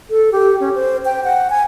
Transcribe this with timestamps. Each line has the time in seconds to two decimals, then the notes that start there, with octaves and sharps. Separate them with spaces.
0.10 A4
0.32 G4
0.60 C#4
0.75 C5
1.05 G5
1.24 F#5
1.50 G#5